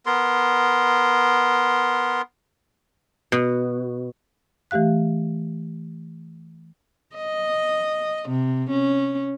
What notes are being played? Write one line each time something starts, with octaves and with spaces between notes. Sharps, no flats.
B3 A#4 C6
B2
E3 A3 G4 F5 F#6
D#5
C3
C#4